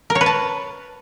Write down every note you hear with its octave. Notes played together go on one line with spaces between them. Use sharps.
A#4
C#5
B4
A5